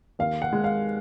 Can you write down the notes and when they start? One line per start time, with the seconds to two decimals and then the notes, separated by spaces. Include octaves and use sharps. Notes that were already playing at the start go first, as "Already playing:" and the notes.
0.19 D#2 F5
0.42 F#5
0.53 G#3
0.64 F5